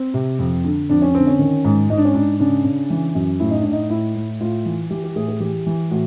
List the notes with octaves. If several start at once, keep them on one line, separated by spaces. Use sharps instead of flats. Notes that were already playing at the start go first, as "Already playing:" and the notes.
Already playing: C4
C3
F2
D3
F2 D4
C#4
D3 C4
C#4
D#3
G#2
G#2 D#4
D4
C#4
G#2 D4
C#3 D4
C#3
E3
F#2
A2 E4
D#4
A2 D4
D#4
A2 E4
A2
A2 F4
E3
E3 G4
G4
A2 G#4
G#4
E3 G4
E3
A2 F#4